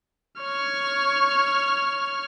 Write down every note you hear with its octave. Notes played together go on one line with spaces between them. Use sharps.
C#5 F6